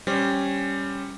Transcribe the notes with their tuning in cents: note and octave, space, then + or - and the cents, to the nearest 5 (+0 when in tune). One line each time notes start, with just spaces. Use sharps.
G3 +0 C#4 +0 C5 +0